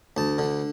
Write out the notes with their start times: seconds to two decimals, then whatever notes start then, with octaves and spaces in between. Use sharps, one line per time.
0.17 D2 A5
0.38 D3